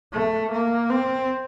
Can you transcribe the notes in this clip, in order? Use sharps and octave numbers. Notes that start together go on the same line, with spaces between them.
A3
A#3
C4